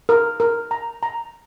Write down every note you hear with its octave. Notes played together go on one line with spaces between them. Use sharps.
A#4
A#4
A#5
A#5